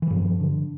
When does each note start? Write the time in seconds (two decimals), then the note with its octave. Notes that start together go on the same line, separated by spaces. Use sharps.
0.02 E3
0.10 G2 F3
0.40 D3